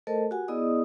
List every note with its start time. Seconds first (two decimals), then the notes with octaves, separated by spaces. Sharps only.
0.07 A3 A4 A#4 C5 D#5 A5
0.31 F#4 G4 A#4 F#5 G#5
0.48 B3 E4 G#4 D5 D#5 D#6